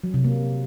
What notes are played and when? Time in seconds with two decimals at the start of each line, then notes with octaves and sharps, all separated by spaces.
0.04 F#3
0.14 C3
0.24 A#3